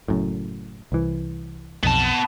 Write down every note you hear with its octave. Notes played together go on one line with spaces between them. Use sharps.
F#1 F#2 A2
C2 E3
B1 F2 B3 A5